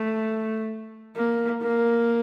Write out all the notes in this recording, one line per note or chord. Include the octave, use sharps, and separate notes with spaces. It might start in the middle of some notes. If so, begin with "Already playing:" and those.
Already playing: A3
A#3
A#3